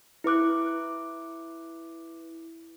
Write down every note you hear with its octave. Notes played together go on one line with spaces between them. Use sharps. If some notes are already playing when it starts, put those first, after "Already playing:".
E4 B4 D6 F#6